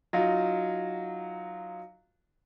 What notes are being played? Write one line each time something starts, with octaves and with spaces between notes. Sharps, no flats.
F#3 D#4 F4